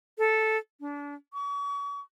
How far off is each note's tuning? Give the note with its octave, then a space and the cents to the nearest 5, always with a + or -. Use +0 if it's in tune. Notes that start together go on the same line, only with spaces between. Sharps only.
A4 -5
D4 -30
C#6 +40